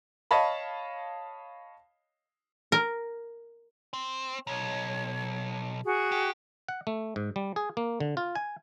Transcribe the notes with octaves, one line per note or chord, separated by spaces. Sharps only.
C#5 D#5 F5 A5 B5
A#4
C4
B1 C#5
F#4 G#4
G4
F#5
A3
G#2
G3
G#4
A#3
D3
F4
G#5